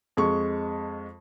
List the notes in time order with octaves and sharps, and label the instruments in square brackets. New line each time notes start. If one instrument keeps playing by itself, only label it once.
[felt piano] F2 G#3 C#6